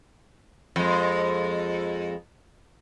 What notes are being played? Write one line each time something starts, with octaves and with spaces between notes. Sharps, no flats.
F2 G#3